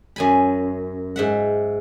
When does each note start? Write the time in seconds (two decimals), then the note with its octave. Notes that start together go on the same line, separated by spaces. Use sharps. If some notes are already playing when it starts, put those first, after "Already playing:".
0.16 F#2 G#5 B5
1.16 G#2 E5 F#5